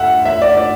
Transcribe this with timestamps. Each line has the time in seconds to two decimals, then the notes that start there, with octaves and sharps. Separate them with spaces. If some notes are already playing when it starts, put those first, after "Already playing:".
Already playing: D2 E5 F#5
0.25 E5
0.42 D5
0.57 D5